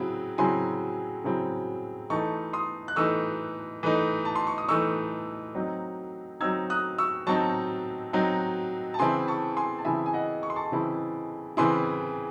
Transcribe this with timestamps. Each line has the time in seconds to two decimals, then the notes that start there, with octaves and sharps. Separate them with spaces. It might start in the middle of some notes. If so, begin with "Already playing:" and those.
Already playing: C#3 F#3 C4 E4
0.38 C#3 F#3 C4 E4 G#5 C6
1.24 C#3 F#3 C4 E4
2.10 E3 A3 D#4 A5 C#6
2.53 C6 D#6
2.88 F#6
2.96 E3 A3 D#4 C#6 E6
3.83 E3 A3 D#4
4.25 A5
4.36 C6
4.47 C#6
4.58 D#6
4.69 E3 A3 D#4 C#6 E6
5.55 F#3 C4 D#4
6.40 F#3 C4 D#4 E6 G#6
6.70 D#6 F#6
6.98 C#6 E6
7.27 F#3 C4 D#4 A5 C#6
8.13 F#3 C4 D#4
8.94 A5
8.99 C#3 E3 C4 E4 G#5 C6
9.28 A5 C#6
9.57 G#5 C6
9.78 A5
9.85 C#3 E3 C4 E4 E5 G#5
10.06 G#5
10.13 D#5 F#5
10.43 C#6
10.50 C6
10.56 A5 C#6
10.72 C#3 E3 C4 E4
11.57 C#3 E3 C4 E4 G#5 C6